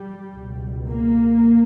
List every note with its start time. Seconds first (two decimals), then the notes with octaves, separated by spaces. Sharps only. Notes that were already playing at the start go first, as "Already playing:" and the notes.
Already playing: G3
0.34 C#2
0.39 B2
0.88 A#3